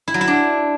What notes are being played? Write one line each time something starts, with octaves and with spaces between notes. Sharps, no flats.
E4
F#3
E4
D4